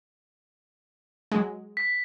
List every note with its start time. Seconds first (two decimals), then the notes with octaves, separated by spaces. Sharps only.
1.32 F#3 G#3
1.77 B6